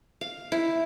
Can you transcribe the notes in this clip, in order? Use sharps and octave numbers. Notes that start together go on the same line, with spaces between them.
F5
E4